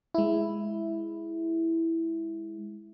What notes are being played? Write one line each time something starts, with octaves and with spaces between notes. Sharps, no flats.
G#3 E4